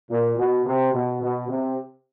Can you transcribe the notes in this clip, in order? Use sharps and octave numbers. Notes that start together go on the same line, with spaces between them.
A#2
B2
C3
B2
B2
C3